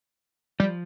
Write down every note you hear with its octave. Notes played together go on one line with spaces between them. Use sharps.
F3 G3